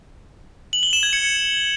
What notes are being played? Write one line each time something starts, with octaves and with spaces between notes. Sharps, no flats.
F#7
G7
E7
G#6
C#7